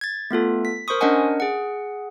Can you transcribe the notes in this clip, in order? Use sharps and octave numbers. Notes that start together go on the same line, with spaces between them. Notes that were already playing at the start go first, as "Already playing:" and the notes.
G#6 A6
A3 B3 F4 A4
B6
A#4 C5 C6 C#6 D#6
C#4 D4 A#4 D#5 F#5 G#5
G#4 F#5